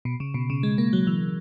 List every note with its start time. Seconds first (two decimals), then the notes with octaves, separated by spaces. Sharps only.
0.05 B2
0.20 C#3
0.34 B2
0.50 C#3
0.63 G#3
0.78 A#3
0.93 F#3
1.07 E3